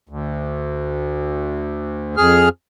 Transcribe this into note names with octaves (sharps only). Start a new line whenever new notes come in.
D2
F2 G#4 F6